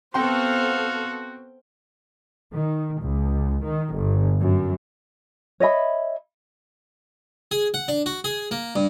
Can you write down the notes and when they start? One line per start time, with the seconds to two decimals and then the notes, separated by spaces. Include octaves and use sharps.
0.14 B3 C4 F#4 A4 C5 F5 G5 C6
2.53 D#3
3.01 C#2
3.64 D#3
3.95 G1
4.42 F#2
5.60 C#5 D#5 E5 B5
7.51 G#4
7.74 F#5
7.88 D4
8.06 F#4
8.24 G#4
8.51 A#3
8.76 G2